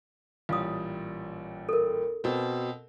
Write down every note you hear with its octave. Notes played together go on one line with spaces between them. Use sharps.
A1 A#2 G3 F5 D#6
A4 A#4
B2 C4